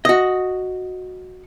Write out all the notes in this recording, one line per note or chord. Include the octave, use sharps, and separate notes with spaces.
F#4 D#5